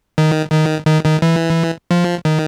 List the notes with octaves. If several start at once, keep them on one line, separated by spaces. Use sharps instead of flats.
D#3
D#3
D#3
D#3
E3
F3
D#3